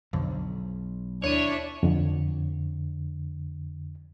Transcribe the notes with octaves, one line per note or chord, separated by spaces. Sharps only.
B1 F2 D3
D#2 D4 E4 C#5 D#7
F2 D3